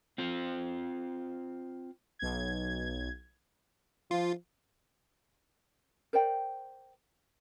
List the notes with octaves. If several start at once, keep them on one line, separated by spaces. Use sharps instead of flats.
C4 F4 C5
B1 G#6
F3 F4
A#4 C5 D5 G5